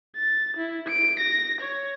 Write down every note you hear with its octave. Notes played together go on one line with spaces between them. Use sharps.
A6
E4
D7
A#6
C#5